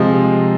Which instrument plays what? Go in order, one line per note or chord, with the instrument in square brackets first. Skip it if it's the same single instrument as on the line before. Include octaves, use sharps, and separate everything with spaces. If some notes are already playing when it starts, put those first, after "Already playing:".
Already playing: [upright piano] C3 F3 G#3